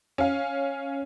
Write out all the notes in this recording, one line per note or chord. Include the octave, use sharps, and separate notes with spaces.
C#4 F5